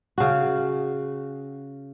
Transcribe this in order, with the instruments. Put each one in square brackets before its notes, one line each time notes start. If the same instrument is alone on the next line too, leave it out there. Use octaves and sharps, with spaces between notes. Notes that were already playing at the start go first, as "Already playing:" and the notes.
[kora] C#3 F#4